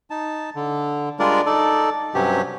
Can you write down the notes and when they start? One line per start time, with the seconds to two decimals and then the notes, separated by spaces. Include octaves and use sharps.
0.10 D#4 A5
0.55 D3
1.19 G3 G#3 D4 F4 A#4 D5
1.46 D#4 A4 D5
2.15 G2 C3 F#3 C#4 G4